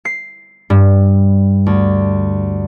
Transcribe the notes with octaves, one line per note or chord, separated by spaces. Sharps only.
C7
G2
D2